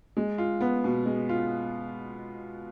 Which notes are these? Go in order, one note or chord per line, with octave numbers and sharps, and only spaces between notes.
G#3
F4
B3
B2
G#3
F4